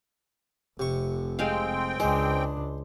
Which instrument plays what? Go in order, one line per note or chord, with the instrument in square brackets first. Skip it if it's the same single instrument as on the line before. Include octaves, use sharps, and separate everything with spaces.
[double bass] F1 [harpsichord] C3 C#6
[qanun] G#3 F5 [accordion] C4 G5
[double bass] C#2 D4 [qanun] G#3 [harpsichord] C5